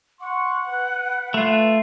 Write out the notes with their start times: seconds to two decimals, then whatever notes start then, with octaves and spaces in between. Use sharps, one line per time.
0.21 F#5 C6 C#6
0.67 B4
1.34 A3 F4